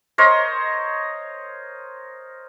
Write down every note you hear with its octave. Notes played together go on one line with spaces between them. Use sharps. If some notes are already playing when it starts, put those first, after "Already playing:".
A#4 C5 C#5 D#5